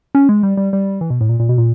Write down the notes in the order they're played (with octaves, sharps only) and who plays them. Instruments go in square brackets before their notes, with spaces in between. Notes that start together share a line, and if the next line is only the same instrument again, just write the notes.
[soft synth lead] C#4
G#3
G3
G3
G3
E3
B2
A2
A#2
A#2
B2
A#2